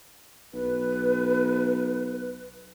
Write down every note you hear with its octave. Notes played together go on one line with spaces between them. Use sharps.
B1 B4